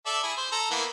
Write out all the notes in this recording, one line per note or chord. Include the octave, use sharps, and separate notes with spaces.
A4 D5 E5
E4 G#4
C5
A4 A#5
E3 A#3 B3